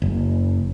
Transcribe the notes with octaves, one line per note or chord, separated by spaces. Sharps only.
F#1